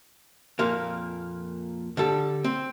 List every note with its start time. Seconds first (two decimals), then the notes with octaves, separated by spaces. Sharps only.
0.59 F2 A#2 A#3
1.97 D3 G3 A4
2.44 C4